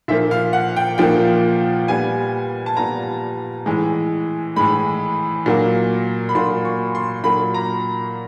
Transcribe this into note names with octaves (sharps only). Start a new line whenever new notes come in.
A#2 F3 A#3 E5
F5
F#5
G5
A#2 F3 A#3 G5
A#2 G3 B3 G#5
A5
A#2 G3 B3 A#5
A2 E3 G#3
A2 E3 G#3 B5
A#2 F#3 A#3
B5
A#2 F#3 A#3 C6
C#6
C6
A#2 F#3 A#3 B5
A#5